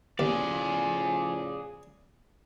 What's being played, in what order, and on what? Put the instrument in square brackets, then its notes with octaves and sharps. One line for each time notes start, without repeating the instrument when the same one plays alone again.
[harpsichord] D#2 [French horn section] A2 C#3 F3 [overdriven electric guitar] G#4 D5